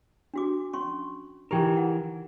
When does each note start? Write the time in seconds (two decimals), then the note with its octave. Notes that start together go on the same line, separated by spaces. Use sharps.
0.34 D4 F#4 D6
0.73 C#4 C6 C#6
1.51 E3 D#4 G4 A#4 G5
1.77 F#5